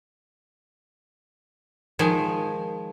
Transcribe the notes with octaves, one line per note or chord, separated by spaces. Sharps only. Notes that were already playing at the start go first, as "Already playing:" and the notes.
D#3 F3 G#3 G#5